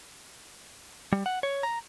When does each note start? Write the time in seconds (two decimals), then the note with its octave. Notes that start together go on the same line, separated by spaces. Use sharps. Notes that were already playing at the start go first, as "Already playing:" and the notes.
1.13 G3
1.26 F#5
1.43 C#5
1.63 A#5